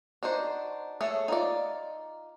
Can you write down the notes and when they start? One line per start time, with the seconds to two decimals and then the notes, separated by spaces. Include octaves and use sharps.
0.23 D4 D#4 F#4 C5
1.01 A3 G#4 A4 C#5
1.28 D#4 F4 D5